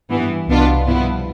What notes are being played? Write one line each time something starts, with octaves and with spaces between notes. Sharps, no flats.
G2 E3 B3
C2 B2 B3 D4 F4
G2 F3 B3 E4